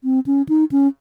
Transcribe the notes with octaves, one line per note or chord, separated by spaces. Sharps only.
C4
C#4
D#4
C#4